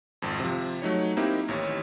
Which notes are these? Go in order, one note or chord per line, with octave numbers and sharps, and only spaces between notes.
G#1 F2
C3 F3
F#3 A3 D#4 C#5
A#3 C4 D#4 E4 G4
A1 D#2 C#5